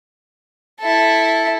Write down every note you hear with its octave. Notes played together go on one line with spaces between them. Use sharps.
E4 A4